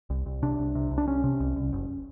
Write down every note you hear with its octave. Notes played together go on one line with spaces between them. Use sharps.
C2
C2
C3 D4
C2
C3
C2
D4
C3 C#4
C3
C2
C2
F#1